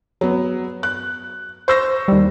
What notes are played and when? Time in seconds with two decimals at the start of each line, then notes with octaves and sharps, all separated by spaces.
0.21 F#3 B3
0.83 F#6
1.68 C5 C#6 E6 A#6
2.08 D#2 G3